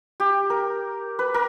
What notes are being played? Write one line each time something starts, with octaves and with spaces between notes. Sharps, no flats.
G4
A#4
B4
A#4